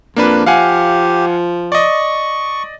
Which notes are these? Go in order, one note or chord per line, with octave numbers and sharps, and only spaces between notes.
F2 A#3 D4 B4
F3 G4 F5 F#5 G#5
D5 D#5 C#6